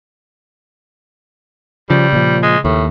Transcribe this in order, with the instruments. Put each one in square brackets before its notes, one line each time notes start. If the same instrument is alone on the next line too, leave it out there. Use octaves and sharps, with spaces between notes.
[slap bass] C#3 [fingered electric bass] F3 [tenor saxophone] G3
[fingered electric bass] A#2 F3
[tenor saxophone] G#3
[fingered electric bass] D#2 [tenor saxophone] A2